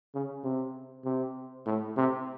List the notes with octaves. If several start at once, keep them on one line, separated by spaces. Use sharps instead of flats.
C#3
C3
C3
A2
C3